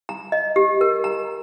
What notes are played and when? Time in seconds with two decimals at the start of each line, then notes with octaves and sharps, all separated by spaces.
0.09 A#5
0.32 D#5
0.56 G4
0.81 A#4
1.04 A#5